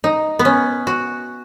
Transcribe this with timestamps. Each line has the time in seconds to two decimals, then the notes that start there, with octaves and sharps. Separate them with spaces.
0.04 D#4
0.39 B3
0.45 C#4
0.87 F#4